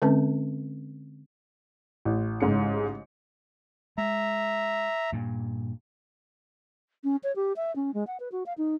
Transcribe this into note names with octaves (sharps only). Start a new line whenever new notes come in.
D3 G#3 C4 C#4 B4 A5
A1
G#2 C#3 C#7
G#3 E5 A#5
G2 A#2
C#4
C#5
G4
E5
C#4
G#3
F#5
B4
F#4
F5
D#4